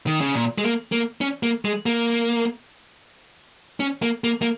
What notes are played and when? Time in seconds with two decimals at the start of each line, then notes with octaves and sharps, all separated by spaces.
0.07 D#3
0.21 C#3
0.35 A#2
0.58 G#3
0.64 A#3
0.92 A#3
1.21 C#4
1.43 A#3
1.65 G#3
1.86 A#3
3.80 C#4
4.02 A#3
4.24 A#3
4.42 A#3